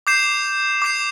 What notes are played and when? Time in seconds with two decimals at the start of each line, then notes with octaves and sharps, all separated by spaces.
0.07 D6 G6 C7 E7
0.82 D6 G6 C7 E7